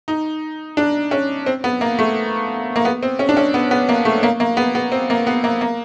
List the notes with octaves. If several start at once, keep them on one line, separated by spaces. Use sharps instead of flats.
D#4
D4
C#4
C4
B3
A#3
A3
A#3
B3
C4
C#4
D4
C#4
B3
B3
A#3
A3
A#3
A#3
B3
B3
C4
A#3
B3
A#3
A#3